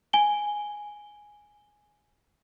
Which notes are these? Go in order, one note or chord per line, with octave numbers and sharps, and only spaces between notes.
G#5 G7